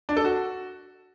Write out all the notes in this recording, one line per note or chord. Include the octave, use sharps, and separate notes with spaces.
D4
A4
F#4